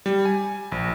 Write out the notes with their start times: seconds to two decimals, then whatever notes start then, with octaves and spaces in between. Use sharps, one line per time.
0.06 G3
0.25 G#5
0.72 A#1